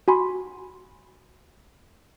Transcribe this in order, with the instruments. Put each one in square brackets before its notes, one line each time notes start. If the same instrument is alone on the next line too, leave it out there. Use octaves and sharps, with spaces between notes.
[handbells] F#4 G#5 B5 C6